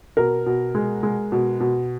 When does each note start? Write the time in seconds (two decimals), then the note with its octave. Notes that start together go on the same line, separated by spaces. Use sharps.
0.17 B2 A#4
0.46 B2
0.75 G#3
1.03 G#3
1.32 B2
1.60 B2